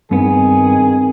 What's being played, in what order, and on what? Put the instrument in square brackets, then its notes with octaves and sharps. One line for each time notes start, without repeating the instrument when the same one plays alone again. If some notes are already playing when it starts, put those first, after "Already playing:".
[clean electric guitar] G2 B3 [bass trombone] D#3 [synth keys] C4 [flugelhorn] G#4